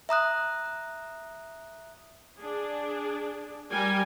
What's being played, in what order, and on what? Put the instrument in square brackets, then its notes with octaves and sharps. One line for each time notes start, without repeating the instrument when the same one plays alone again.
[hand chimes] E5 A#5 D#6 F#6
[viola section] D4 G#4
G3 G4 A#4 G5 G#5